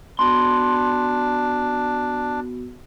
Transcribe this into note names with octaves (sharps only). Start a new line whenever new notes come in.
B3 D4 F#4 C6